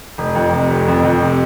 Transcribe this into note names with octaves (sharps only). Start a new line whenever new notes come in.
F1
F2
C3
F1
F2
F2
C3